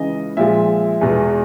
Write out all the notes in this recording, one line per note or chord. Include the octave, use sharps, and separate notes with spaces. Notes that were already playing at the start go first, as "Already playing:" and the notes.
Already playing: C#2 C#3 E3 D#5
A#2 F3 G#3 E5
E2 B2 G#3